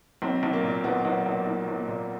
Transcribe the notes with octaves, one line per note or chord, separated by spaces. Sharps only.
B1 C4
B1
A#3
A#2
B1 B3
B1 B3
B1 B3
B1
B1
A#2